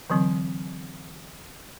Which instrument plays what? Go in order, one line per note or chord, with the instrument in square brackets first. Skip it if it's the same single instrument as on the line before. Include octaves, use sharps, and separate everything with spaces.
[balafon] D3 E3 F#3 C4